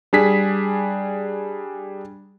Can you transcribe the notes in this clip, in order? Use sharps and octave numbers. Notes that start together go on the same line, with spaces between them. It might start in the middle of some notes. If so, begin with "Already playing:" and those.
G3 D4 G#4 B6